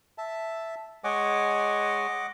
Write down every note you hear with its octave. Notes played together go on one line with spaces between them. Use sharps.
E5 A5
G#3 C#5 D#5 F#5 G#5 D6